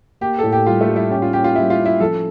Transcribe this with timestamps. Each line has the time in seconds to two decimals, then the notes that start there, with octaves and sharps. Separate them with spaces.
0.21 A#3 G4
0.39 A2 A4
0.52 G4
0.66 G3 F4
0.81 A3
0.89 G3
0.96 E4
1.11 C#4 G4
1.22 F4
1.33 A#3 G4
1.44 F4
1.55 G3 E4
1.70 F4
1.78 C#4
1.85 E4
2.00 F3 A4